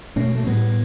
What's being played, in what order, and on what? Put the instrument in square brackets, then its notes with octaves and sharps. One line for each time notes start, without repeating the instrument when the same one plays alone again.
[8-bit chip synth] B2 [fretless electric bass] A3 C#4
[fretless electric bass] A3
[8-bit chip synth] A2 [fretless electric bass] G3 B3